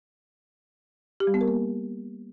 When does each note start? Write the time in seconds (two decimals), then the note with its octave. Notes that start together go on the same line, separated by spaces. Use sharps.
1.20 G4
1.27 G3
1.34 B3
1.41 A#4
1.48 A#3